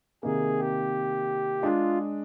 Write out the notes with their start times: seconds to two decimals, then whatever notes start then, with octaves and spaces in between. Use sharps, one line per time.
0.23 C3 D#3 A#3 G#4
0.59 G4
1.62 G#3 D4 F4 G#4